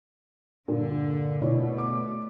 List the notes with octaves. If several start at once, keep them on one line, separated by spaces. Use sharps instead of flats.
G2 A#2 D3
B2 A3 E4 C#5 D5
D6